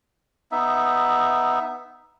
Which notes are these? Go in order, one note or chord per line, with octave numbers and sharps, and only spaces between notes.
B3 D#4 E5